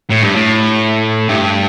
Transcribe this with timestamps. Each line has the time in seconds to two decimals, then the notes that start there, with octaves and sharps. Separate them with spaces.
0.11 A2
0.23 G2
0.35 A2
1.28 G2